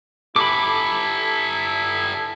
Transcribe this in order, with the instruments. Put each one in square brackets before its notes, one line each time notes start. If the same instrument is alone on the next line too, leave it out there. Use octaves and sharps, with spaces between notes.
[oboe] E4 [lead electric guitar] G4 A4 [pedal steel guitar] B5 D6